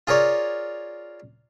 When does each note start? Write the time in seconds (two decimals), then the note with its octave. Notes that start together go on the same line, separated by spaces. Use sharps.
0.07 F4 G#4 A#4 C#5 D5